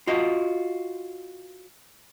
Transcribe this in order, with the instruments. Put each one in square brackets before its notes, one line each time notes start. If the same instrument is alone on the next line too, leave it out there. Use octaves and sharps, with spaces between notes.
[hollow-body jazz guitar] F4 F#4 D#5